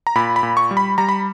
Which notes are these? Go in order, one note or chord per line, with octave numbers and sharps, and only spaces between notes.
A#5
A#2 B5
B5
A#2
C#6
G3
B5
G3 A#5
B5